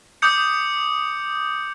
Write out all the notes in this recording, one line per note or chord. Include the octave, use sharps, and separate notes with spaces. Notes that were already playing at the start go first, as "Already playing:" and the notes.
D6 D#6 G6 C#7